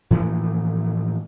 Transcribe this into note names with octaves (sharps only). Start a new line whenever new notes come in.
A2 E3 F3 A#3